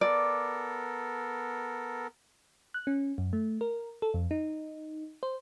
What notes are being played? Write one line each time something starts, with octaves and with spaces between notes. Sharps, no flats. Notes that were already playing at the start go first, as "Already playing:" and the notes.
B3 A4 A#4 D5
F#6
C#4
F#2
A3
A#4
A4
F2
D#4
C5